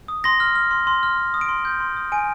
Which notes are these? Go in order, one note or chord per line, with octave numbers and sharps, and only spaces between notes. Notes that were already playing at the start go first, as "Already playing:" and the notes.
D#6
C6 A#6
F6
F6
C6
C6
F6
C6
D#6
D7
C6
G6
C6
D#6
G#5 D7